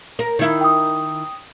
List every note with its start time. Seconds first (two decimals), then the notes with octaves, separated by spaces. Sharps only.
0.19 A#4
0.39 D#3 E4
0.61 G5 D#6